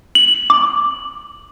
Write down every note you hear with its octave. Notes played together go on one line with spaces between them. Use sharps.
F#7
D6